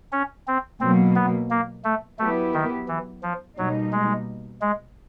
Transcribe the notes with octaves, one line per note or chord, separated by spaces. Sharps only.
C#4
C4
B2 F#3 A#3 C4
B3
A#3
A3
F#3 A3 B3 E4 G4 B4
D#3
E3
F3
B2 F#3 G3 A#3 D#4
G#3
G#3